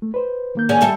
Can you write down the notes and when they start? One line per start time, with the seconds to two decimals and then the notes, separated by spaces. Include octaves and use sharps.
0.02 A3
0.14 B4 C5
0.55 D#3 A#3 G6
0.69 D3 C#4 G#4
0.81 G3 A4 E5